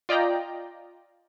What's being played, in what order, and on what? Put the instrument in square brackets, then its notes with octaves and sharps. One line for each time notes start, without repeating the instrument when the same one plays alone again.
[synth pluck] F4 D5 D#5 G5 A#5